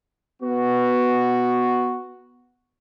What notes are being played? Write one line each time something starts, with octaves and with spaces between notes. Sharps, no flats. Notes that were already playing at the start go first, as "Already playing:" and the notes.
B3 F#4